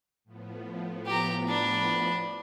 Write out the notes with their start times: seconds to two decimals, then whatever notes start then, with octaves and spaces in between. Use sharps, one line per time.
0.24 A2 F3 B3
1.06 G4 A#5
1.48 D4 B5